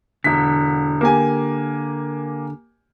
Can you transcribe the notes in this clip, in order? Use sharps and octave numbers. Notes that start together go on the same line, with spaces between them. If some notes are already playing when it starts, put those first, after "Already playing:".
E1 D3 B6
A#3 G4 G#5